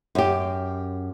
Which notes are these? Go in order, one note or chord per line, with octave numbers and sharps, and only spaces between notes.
F#2 G4